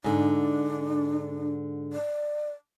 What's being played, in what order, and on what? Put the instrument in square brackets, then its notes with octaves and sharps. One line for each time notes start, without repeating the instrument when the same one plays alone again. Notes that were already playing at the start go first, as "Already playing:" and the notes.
[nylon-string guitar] G#2 D3 [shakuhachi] D4
[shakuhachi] D5